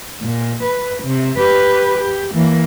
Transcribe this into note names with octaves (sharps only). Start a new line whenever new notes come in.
A#2
B4
C3
G4 B4
G4
E3 A#3